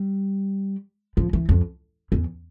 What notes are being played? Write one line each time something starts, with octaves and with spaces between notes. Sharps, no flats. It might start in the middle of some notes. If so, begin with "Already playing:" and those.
Already playing: G3
F3
E3
F2
E2